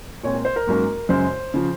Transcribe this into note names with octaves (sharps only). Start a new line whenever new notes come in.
A#2 G#3 C4 C#5
A#4
C5
A#4
G#2 F#3 A#3 C#4
F#2 C#3 G#3 C5
C#3 F3